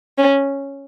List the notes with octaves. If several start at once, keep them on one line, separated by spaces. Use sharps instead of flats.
C#4